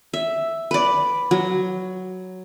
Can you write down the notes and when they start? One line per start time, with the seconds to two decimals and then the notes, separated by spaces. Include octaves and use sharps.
0.14 E5
0.71 B4 D5
1.31 F#3